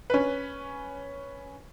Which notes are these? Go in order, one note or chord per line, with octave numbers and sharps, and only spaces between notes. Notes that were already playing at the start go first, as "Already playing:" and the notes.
C#4 B4